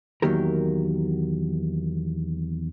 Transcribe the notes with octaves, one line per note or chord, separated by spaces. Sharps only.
E2 D#3 F#3 A#3 G4 A#4